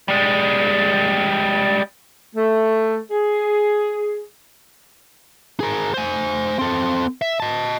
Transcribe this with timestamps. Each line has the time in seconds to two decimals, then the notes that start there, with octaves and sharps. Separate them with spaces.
0.08 G3 G#3
2.35 A3
3.11 G#4
5.60 G#4 A#4
5.94 C5 G#5
6.59 C4 A4
7.22 E5
7.40 D#5 A5